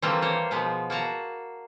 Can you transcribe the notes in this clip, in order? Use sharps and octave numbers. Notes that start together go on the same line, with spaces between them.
E3 G3 A3 A#3 C4 F4
A#3 C5 C#5
B2 F3 G#3 B3
A#3 F#4 A5 A#5